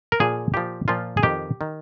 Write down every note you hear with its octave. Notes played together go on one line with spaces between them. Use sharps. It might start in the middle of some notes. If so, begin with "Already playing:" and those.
A#4
A#2 F3 G#4
A#2 F3 G4
A#2 F3 F4
G#4
F2 D#3 G4
D#3